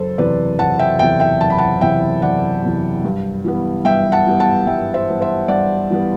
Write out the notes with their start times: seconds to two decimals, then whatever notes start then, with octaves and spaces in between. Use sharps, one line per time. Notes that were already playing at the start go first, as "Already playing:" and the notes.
Already playing: F#1 A4 C5
0.18 E2 C3 E3 B4 D5
0.59 F#1 F#5 A5
0.79 E5 G5
0.99 E2 E5 G5
1.02 C3 E3
1.20 E5 G5
1.41 F#1 A5
1.50 B5
1.58 F#5 A5
1.81 E2 C3 E3 E5 G5
2.22 F#1 D5 F#5
2.63 E2 C3 E3
3.04 G2
3.44 E3 G3 B3
3.85 G2 E5 G5
4.12 F#5 A5
4.26 E3 G3 B3
4.40 F#5 A5
4.67 G2 E5 G5
4.94 C5 E5
5.08 E3 G3 B3
5.21 C5 E5
5.48 G2 D5 F#5
5.90 E3 G3 B3